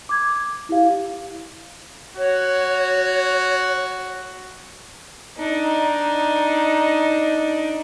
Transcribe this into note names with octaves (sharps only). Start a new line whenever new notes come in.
D6 G#6
E4 G4 F5
F#4 C#5
D4 D#4